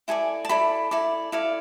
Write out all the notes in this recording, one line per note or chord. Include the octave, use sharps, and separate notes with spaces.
E4 A4 D5 G#5
A5
E4 A4 D5 B5
E4 A4 D5
E4 A4 D5 F5